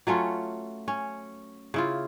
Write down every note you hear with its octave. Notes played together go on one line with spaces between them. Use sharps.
F#3 A3 C#4 F4
C#4
C#3 E4 F4